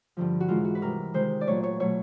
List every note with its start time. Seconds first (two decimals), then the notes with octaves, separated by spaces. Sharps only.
0.17 G2 D3 F3
0.40 F#4
0.48 G#2 E3 G#3 F4
0.65 F#4
0.75 B4
0.81 C3 E3 G3 A#4
1.14 C3 D#3 G#3 C5
1.41 D5
1.47 A#2 F#3 A3 C#5
1.63 C#5
1.80 B2 F#3 A3 C#5